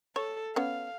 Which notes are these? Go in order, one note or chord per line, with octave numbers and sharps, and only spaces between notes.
A4 C#5
B3 C#4 F5